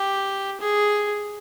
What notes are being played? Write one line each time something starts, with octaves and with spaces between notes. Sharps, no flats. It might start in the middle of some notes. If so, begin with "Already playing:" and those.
Already playing: G4
G#4